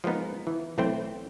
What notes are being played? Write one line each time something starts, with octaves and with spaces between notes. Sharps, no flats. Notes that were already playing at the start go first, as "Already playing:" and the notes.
F3 G#3 A#3 B3 D#4
E3
B1 E3 A3 C4 C5 G5